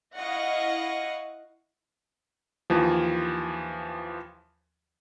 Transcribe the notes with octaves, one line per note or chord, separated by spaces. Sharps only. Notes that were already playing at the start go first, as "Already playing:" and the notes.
E4 D#5 F5 F#5 C#6 A#6
D#2 E3 F3